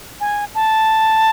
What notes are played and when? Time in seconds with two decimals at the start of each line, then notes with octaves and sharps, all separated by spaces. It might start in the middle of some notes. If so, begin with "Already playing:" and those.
0.21 G#5
0.55 A5